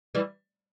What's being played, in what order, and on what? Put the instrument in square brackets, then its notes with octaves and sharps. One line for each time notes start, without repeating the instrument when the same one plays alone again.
[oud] E3 G3